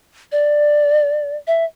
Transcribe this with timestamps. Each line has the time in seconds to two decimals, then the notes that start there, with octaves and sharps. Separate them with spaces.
0.32 D5
1.47 E5